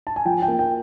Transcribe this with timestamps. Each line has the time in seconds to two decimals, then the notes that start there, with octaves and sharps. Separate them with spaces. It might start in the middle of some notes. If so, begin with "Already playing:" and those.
0.07 A5
0.16 G#5
0.25 F3 G5
0.42 G5
0.48 A#3
0.59 G5